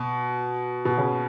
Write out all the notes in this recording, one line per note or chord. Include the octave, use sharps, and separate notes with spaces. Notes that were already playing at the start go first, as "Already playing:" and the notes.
Already playing: B2
B2
C#3